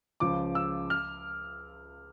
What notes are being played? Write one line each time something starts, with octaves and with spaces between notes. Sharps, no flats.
C#2 C#3 F3 D6
E6
F6